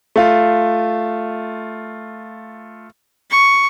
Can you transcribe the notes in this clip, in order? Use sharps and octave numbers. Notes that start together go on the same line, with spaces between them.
A3 F4
C#6